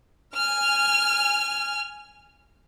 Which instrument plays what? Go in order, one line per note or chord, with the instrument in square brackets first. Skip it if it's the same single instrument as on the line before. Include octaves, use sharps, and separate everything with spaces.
[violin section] G#5 F6